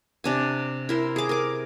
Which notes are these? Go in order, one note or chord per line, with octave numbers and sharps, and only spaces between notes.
C3 D4 G#5
E4 A#4 C5
G#4 D6
A#4 D6